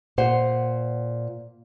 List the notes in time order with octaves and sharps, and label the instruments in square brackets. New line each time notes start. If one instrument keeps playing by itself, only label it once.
[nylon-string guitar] A#2 C5 F#5